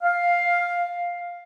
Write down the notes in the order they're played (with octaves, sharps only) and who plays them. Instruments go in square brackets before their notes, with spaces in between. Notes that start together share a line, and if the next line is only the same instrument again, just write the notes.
[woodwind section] F5